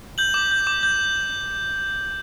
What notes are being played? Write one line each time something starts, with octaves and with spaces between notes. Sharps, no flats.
G6 F#7
D6
G6
D6
G6